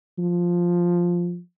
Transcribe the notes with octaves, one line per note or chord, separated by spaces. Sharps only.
F3